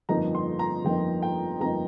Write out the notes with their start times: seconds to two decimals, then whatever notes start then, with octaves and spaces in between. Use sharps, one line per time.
0.09 G1 F2 F3 A#3 D#4 A#5
0.35 C6
0.59 A#5
0.85 G1 F2 F3 A#3 D#4 G5
1.23 G5
1.60 G1 F2 F3 A#3 D#4 A#5